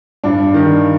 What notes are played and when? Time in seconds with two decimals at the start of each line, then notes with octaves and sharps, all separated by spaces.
0.24 G2 D4
0.54 D#3